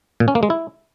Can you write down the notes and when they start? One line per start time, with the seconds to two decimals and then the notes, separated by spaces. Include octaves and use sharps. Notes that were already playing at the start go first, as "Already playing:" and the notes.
0.20 A#2
0.28 C#4
0.35 A#3
0.43 G#3
0.50 E4